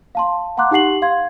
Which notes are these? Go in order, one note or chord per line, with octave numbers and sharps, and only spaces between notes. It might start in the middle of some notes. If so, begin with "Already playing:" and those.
F5 A5 C6
F5 F#5 A#5 C6 D6 F#6
D#4 G4 F#5 C7 F#7
F5 C6 G#6